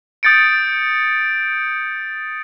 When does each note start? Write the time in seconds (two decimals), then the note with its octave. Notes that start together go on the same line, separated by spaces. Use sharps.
0.23 D#6 G6 A6 C#7 D7